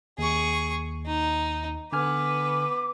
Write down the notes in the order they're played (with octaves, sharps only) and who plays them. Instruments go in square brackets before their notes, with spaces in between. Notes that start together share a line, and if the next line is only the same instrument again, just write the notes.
[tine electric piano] D#2 [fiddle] G#4 C#6
[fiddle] D#4
[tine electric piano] D3 G#5 F6 [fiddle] B3 B4 [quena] D6